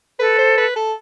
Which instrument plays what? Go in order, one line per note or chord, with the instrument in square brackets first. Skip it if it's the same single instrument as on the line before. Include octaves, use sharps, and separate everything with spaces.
[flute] A4 [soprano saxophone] B4
[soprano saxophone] C5
B4
A4